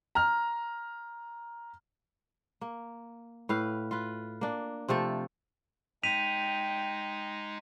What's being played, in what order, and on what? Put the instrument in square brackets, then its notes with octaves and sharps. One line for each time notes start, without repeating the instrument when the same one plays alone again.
[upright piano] A#5 F6
[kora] A#3
A2 B4 F5
F4 B4
A#3 D4
C3 F3 A3 A4
[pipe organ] G#3 D#4 [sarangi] G5 [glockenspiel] B6 D#7 F7